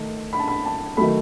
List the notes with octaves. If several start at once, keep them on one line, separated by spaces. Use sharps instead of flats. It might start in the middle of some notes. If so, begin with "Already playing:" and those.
Already playing: D#3 A3 A5
B5
A5
B5
A5
D#3 F#3 A3 B5